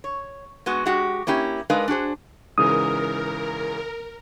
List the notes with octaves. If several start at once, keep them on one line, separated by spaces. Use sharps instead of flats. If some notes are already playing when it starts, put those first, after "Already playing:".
C#5
G#3 B3 F#4
G#3 F#4 G4
A#3 C#4 E4 G4
G#3 D4 D#4 A#4 B4 F5
D4 F#4 G#4 C5
G#2 C#3 E3 A#4 D#6